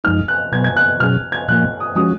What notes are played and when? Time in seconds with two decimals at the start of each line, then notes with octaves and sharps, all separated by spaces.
0.04 F#2 F3 G#3 D#4 F6
0.28 F#6
0.52 B2 F#3 B3 G#6
0.64 G#6
0.77 F#6
1.00 B2 F#3 C#4 G#4 F6
1.32 G#6
1.48 A#2 F3 A#3 F#6
1.80 D#6
1.95 F3 G#3 C#4 F#4 D#6